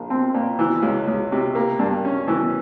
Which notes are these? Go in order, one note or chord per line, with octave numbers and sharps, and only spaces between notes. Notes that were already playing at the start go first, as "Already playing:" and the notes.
Already playing: A#1
C4
A#2
E3
C#2
C#2
C3
A#3
G2
C#4
E3